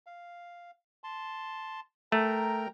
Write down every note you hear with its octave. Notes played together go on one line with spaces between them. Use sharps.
F5
A5 C6
A3 A#4 G5 A#5